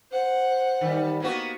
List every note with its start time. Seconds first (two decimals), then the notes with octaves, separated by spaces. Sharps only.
0.11 C5 F#5
0.81 D#3 G3
1.20 A#3 B3 F#4